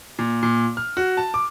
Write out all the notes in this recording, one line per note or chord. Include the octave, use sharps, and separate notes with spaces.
A#2
A#2
F6
F#4
A5
D6